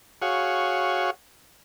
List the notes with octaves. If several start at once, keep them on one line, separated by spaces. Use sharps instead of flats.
F#4 G#4 C#5 F5 F#5